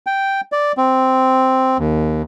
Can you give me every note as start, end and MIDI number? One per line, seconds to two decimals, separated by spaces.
0.07 0.41 79
0.52 0.72 74
0.77 1.77 60
1.78 2.22 39